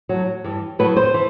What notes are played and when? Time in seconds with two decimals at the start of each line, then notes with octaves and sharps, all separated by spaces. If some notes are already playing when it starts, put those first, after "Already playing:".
0.09 A2 F#3
0.44 G2 E3
0.79 A2 F#3 B4
0.97 C5
1.14 E3